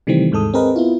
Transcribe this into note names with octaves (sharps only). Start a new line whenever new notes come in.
C3 D#3 E3 G3 A3 C4
D#2 G#2 G#3 A4 D#6
C4 G#4 A#4 B4 D#5
B3 E4 F4